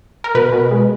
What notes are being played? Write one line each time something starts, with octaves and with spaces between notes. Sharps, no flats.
A#4
B2 B4
B2
G#3